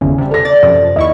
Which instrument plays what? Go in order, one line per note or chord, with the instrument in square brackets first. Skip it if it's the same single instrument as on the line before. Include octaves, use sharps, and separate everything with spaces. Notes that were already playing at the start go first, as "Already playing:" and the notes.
[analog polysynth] G1 E2 [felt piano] C#3
[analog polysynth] C3 G3
[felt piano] A4 A#6
[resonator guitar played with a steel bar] D5 [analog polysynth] A6
[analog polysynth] F#2 C3 F3
[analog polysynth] D#2 E4 C#6 [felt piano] D#5